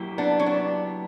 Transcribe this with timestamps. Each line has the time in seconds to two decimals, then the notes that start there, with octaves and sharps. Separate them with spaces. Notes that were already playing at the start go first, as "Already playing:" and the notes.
Already playing: F#3 A#3 E4 G4
0.18 B3 D4
0.39 C#4
0.46 B3 D4